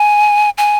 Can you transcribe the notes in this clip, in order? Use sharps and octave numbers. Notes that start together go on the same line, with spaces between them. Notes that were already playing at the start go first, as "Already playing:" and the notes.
Already playing: G#5
G#5